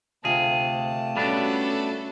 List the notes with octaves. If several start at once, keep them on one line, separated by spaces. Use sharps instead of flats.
D2 C3 A3 F4 G#4 F5 G5 A5
G3 B3 C#4 D4 F#4 A4